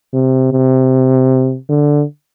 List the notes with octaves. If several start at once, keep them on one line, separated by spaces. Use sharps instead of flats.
C3
C3
D3